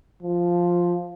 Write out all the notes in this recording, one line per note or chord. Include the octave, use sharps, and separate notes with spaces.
F3